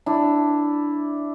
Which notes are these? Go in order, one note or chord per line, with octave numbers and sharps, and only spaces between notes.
D4 E4